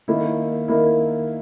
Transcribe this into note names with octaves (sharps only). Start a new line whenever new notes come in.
D#3 A#3 E4
D#3 A#3 E4